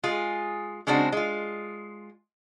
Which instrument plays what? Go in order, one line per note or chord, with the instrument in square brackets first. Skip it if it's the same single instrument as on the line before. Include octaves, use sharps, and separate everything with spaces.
[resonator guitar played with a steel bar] G#3 F4 G#4
C#3 G#3 C4 D4 F#4
G#3 F4